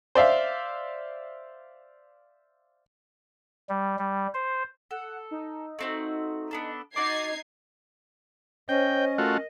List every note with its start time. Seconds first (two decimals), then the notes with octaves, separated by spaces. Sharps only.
0.15 C5 D5 E5 F5
3.69 G3
3.99 G3
4.34 C5
4.91 A4 F#5
5.31 D#4
5.79 A3 C4 F#4
6.51 B3 D4 A4
6.96 D#4 F#4 D6 G#6 A6 C7
8.69 C#4 C5 C#5 D#5 G5
9.18 A3 F4 F#4 A#4